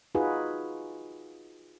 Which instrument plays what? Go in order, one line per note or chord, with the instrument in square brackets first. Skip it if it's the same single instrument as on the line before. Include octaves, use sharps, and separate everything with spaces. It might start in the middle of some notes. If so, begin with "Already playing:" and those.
[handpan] D#4 F4 F#4 G#4 B4